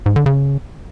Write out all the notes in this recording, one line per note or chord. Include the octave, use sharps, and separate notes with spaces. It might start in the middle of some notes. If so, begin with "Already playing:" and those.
G#2
D3
C#3